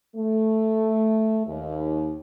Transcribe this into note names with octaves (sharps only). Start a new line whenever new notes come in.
A3
D#2